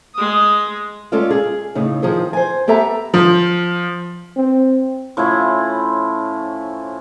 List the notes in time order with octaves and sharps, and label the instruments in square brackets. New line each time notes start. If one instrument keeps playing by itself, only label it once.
[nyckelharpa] G#3 D#6
[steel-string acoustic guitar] G#3 C#4 F4 A4 D5 F5
G#4
A2 C#3 D#4
D#3 F3 G#4 C5
C5 G#5
B3 G4 A4 E5 A#5
[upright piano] F3
[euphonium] C4
[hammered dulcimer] A2 F3 C#4 E4